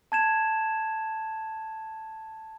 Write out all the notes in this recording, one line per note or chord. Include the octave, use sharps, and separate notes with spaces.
A5 G#6 E7